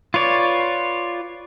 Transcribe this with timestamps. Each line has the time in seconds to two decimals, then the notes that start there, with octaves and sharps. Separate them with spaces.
0.14 F4 B4 C#5 D5